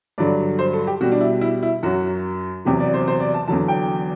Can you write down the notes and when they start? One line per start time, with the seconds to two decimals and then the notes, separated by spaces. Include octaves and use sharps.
0.18 G2 D3 F#3 D5
0.59 C5
0.73 A4
0.87 G4
1.01 B2 G3 F#4
1.12 D4
1.21 E4
1.41 E4
1.63 E4
1.83 F#2 F#3 F#4
2.65 E2 C3 F#3 G4
2.80 D5
2.94 C5
3.08 C5
3.20 D5
3.34 A5
3.48 E2 D3 F#3 A5
3.68 G5